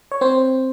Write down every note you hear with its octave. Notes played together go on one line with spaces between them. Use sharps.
C#5
C4 C5